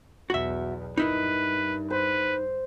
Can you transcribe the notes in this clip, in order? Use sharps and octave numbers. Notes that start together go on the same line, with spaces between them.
B1 E2 F#4 E5
G2 D#4 E4 A#4 B4
B4 C5